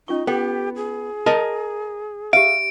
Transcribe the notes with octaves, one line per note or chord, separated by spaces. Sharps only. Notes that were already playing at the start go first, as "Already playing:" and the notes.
C#4 D#4 F4 C#6
B3 G4 A4 G5
G#4
A#4 D#5 A5
G4 E5 F5 D7